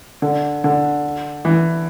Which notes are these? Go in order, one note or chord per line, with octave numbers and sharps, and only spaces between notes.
D3
D3
E3